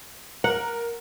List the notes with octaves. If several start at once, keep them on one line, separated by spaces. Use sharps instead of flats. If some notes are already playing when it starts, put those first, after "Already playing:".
A#4 F#5